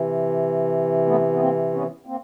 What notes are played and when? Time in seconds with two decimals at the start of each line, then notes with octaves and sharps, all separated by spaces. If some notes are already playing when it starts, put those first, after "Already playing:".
Already playing: C3 E3
1.07 A3 B3
1.32 B3
1.39 A#3 C4
1.73 B3 C#4
2.06 A#3 C4